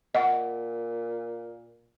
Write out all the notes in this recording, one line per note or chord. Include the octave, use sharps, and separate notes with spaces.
A#2 D#5 F#5